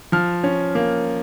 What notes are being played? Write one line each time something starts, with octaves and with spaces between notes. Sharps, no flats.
F3 F6
C#4
A#3